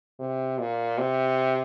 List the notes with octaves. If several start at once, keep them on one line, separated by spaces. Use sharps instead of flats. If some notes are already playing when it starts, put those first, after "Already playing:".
C3
A#2
C3